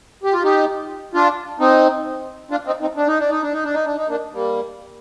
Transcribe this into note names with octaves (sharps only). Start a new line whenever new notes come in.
G4
F4
D#4 G4
D4 F4
C4 D#4
D4 F4
C4 D#4
C4 D#4
D4
D#4
D4
D#4
D4
D#4
D4
D#4
D4
D#4
A#3 D4
G3 A#3